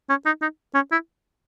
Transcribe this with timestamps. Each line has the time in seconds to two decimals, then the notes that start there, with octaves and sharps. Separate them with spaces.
0.09 C#4
0.26 D#4
0.42 D#4
0.75 C#4
0.91 E4